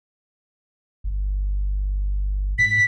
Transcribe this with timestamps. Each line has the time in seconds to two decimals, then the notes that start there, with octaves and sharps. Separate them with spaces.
1.04 G1
2.59 G#2 B6